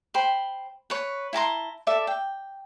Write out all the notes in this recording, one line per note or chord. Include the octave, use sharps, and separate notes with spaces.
C5 G5 B5
B4 C#5
E4 A5 A#5 C6
A4 D5 E5
G5